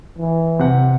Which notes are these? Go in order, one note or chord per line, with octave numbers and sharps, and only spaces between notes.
E3
C3 F#5